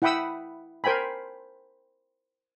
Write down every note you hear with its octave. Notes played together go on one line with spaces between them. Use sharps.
E4 F#5 G5 B5 D#6 E6
A#4 C5 G5 G#5 B5